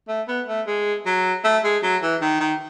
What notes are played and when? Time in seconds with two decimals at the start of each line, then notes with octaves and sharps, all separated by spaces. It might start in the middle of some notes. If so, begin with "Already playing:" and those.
0.08 A3
0.28 B3
0.48 A3
0.67 G#3
1.06 F#3
1.44 A3
1.64 G#3
1.83 F#3
2.02 E3
2.22 D#3
2.40 D#3